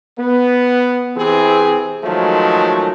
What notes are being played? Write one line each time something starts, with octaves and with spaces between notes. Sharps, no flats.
B3
C3 E3 C4 G#4
D#3 F3 F#3 G#3 A3